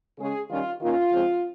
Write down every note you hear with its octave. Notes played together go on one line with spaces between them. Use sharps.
C#3 G#3 C#4 G#4
D#3 G3 C#4 F4
D#3 A#3 C#4 F4
C#3 F3 G#3 C4